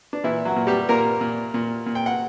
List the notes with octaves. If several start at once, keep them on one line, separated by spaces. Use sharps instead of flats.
D4
A#2 E3 E4
F#3 F#4
A#2
G3 G4
A#2 A#3 A#4
A#2
A#2
A#2
G5
F#5